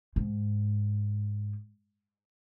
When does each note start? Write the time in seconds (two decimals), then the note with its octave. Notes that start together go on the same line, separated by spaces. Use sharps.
0.16 G#2